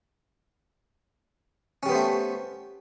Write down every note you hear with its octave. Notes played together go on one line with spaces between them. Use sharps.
G3 A3 B3 C#4 C5